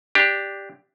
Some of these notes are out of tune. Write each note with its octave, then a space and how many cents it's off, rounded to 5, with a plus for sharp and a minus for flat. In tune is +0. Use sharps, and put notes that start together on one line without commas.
D4 +0 G4 +5